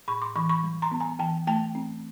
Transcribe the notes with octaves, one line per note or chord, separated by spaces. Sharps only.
A2 B5 C#6
C6 D6
E3 B5 C#6
B5 C#6
G3
A#5 C6
B3
G#5 A#5
E3 G5 A5
A3 G5 A5
C4